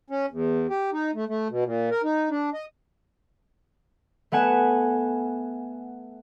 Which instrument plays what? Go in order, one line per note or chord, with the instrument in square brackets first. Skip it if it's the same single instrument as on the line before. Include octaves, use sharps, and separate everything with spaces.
[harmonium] C#4
E2
G4
D#4
A3
A3
B2
A#2
A#4
D#4
D4
D#5
[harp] A3 B3 F#5 G#5 E7